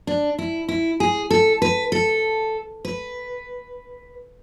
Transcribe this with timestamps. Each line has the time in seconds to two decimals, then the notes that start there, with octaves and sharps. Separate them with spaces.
0.07 D4
0.39 E4
0.68 E4
1.00 G#4
1.31 A4
1.62 B4
1.92 A4
2.85 B4